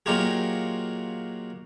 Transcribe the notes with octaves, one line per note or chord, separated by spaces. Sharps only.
A#2 F#3 D#4 F4 G4 G#4